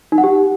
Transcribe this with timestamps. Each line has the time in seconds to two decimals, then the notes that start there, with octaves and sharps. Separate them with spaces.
0.12 D#4
0.18 F#5
0.24 G4